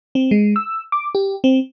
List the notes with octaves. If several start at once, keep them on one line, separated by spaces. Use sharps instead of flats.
C4
G#3
E6
D6
G4
C4